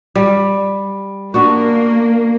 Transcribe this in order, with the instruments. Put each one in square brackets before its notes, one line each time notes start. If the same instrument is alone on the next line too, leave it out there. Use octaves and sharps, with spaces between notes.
[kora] G3
[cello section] A#3 [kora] B3 D4 F#4